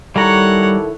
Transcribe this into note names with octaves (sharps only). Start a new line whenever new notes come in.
D#3 G3 E4 A4 C#5 F#5 A#5